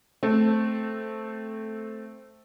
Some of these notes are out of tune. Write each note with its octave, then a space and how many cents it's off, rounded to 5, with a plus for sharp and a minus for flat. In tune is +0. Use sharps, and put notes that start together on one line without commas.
A3 +0 C4 +0